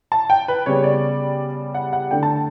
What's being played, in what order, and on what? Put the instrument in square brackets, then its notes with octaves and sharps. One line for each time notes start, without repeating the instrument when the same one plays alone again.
[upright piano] A5
G5
B4
C#3 G3 B3 C#5
D5
F#5
F#5
D3 A3 G5
A5